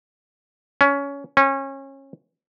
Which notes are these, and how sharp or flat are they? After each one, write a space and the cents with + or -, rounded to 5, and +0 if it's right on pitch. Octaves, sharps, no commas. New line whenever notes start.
C#4 +20
C#4 -25